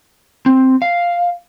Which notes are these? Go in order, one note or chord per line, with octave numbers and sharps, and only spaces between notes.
C4
F5